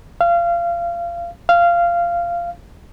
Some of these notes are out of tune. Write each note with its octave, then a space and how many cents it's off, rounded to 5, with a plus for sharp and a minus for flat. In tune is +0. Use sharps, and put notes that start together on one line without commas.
F5 -25
F5 -15